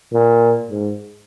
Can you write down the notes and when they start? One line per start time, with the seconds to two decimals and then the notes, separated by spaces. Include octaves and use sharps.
0.13 A#2
0.71 G#2